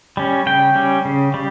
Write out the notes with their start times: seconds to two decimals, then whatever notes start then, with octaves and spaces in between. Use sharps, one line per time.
0.17 G3 C#4
0.46 C#3 G5
0.76 G3 C#4
1.05 C#3
1.34 G3